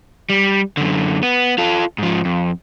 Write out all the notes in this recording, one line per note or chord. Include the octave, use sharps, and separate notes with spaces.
G3
F#2 D3
B3
F4 A4
G#2 F3
F2